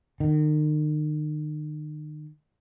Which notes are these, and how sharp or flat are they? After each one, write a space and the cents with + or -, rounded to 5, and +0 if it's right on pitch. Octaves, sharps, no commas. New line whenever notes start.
D#3 -40